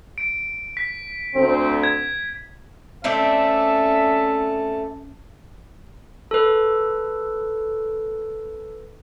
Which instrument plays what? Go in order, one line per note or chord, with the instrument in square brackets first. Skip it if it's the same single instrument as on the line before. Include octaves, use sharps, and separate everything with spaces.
[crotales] D7
B6
[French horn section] D2 C4
[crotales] G#6
[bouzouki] A3 C4 D5 [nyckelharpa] C#4 A5 [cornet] E5
[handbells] A4 B4